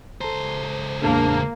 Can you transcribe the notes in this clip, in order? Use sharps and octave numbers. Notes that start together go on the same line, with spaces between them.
C#2 A4 C5 A5 A#5
E2 A2 A#3 D4 G#4